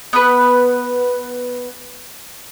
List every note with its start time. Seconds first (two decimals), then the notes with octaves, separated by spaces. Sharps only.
0.13 B3 B4